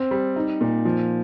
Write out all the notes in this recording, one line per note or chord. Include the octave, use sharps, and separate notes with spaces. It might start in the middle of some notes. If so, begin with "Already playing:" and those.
Already playing: C4
G3
D#4
A#2
F3